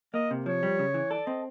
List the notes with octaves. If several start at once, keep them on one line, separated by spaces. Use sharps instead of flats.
A#3 D#5
C3
F3 C#5
G3
C#3
E3
A4 D5
C4 D#5